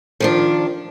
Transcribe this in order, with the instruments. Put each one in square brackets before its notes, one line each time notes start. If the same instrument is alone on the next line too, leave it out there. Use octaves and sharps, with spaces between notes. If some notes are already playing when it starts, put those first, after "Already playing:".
[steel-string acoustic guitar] D#3 F3 D4